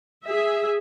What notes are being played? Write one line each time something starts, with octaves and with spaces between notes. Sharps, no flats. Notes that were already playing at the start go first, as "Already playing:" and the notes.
G#4 E5